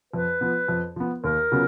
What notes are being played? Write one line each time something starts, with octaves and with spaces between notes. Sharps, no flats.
F2 B4
F3 B3
F2
F3 B3
D#2 A#4
C#3 F#3 B3 F4